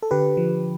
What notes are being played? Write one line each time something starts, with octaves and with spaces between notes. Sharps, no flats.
A4
D3 G4 B4
F3